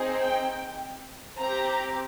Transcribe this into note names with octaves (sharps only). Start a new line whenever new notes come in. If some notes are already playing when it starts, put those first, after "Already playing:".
Already playing: C4 D#4 G#4
G5
C4 G4 A#5